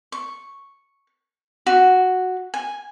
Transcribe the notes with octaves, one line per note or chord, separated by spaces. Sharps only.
C#6
F#4
G#5